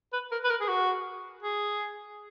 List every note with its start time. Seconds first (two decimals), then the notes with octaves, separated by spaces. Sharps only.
0.13 B4
0.32 A#4
0.44 B4
0.50 A#4
0.60 G#4
0.68 F#4
1.43 G#4